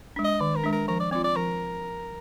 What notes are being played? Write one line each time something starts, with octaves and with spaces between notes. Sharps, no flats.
G#3 D4
D#5
D#3 D5
A#4
G#3 D4
A#4
F3 A#4
D5
C4 F4 D5
D5
F3 A#4